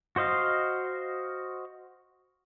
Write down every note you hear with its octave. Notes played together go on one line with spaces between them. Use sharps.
F#4 C5 D#5 F5